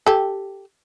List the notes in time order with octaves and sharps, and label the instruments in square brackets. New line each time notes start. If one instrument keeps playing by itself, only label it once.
[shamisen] G4 A4